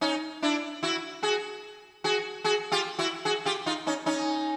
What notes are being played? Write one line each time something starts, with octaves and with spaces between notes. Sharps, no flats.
C#4 D#4
D4 E4
E4 F#4
F#4 G#4
F#4 G#4
F#4 G#4
F4 G4
E4 F#4
F#4 G#4
F4 G4
D#4 F4
C#4 D#4
C#4 D#4